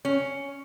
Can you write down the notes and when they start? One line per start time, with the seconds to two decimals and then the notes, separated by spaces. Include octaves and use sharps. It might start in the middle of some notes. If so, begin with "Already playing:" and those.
0.05 C#4